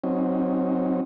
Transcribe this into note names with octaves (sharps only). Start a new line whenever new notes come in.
F#3 C4 C#4 D#4